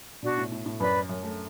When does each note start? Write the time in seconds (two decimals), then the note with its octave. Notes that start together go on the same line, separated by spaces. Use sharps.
0.23 B2 D4 F#4 D5
0.38 A2
0.52 A2
0.66 A2
0.80 F#2 B4 D5 B5
1.09 F#2
1.23 A3